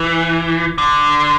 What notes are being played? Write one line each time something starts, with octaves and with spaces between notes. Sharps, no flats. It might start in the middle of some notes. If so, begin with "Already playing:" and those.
Already playing: E3
D3